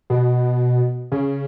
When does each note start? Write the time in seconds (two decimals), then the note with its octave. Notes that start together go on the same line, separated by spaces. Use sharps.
0.10 B2
1.12 C#3